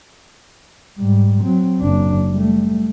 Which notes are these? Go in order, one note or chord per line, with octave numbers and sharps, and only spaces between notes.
G#2 G3
F#3 C4
F#1 D4
G3 A3